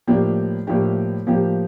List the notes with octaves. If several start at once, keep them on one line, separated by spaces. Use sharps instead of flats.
A2 F3 A#3 D4 G4
A2 F3 A#3 D4 G4
A2 F3 A#3 D4 G4